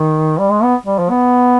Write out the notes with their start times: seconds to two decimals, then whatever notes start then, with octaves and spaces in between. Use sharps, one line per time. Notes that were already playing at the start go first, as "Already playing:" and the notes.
Already playing: D#3
0.39 G3
0.51 G#3
0.63 B3
0.86 G3
0.99 F3
1.10 B3